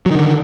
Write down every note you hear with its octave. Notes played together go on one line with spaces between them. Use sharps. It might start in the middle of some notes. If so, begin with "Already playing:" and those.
D3 D#3 F#3